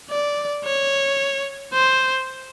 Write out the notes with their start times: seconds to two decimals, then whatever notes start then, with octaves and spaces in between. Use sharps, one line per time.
0.10 D5
0.65 C#5
1.73 C5